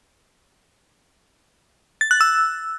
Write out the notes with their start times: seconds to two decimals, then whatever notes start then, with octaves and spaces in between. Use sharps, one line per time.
2.01 A6
2.11 F#6
2.21 E6